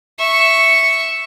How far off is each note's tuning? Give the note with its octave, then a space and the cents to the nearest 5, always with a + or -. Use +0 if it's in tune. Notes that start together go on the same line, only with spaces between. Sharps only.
E5 +0 C#6 +0